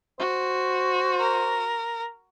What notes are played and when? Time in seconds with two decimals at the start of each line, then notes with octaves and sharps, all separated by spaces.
0.19 F#4 C5
1.20 A#4